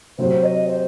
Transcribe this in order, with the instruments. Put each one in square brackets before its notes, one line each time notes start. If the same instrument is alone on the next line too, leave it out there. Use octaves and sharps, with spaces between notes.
[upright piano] C3 F#3 C4 F#4 [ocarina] C5
[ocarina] D#5
C5